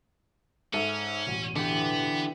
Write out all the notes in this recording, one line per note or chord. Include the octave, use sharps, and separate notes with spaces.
G#2 C#4 A4 E5
E1 A1
D3 E3 B3 G4